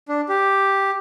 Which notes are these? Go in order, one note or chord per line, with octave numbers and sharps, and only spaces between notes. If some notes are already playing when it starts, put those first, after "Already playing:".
D4
G4